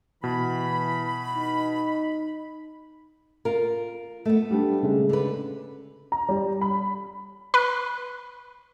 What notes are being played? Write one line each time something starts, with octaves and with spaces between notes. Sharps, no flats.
B2 E3 B5
D#4
F4 A#4
A3 B3
G3 D4
C#3 G#3
D3 B4
A#5
G3
B5
B4